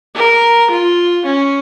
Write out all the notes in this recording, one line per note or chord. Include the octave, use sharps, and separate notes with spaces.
A#4
F4
C#4